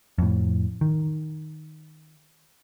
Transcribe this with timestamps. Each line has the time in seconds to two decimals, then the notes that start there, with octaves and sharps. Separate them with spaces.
0.18 F2 A2
0.81 D#3